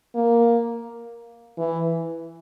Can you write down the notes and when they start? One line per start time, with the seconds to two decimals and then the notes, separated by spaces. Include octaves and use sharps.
0.15 A#3
1.58 E3